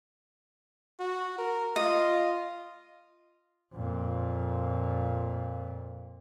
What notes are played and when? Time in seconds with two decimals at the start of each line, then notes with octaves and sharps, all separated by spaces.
1.00 F#4
1.38 A#4
1.76 F4 D#5
3.73 F2 A#2